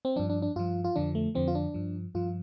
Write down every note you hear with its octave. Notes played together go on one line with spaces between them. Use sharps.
C4
G2 F3 D4
D4
D4
G2 F3 F4
F4
F2 D3 F3 D4
A3
F2 D3 F3 C4
F4
D4
G2 F3
G2 F3 F4